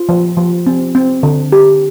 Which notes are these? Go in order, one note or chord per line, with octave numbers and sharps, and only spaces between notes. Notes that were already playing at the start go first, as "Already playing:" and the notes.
Already playing: F4
F3
F3
C4
C4
D3
G4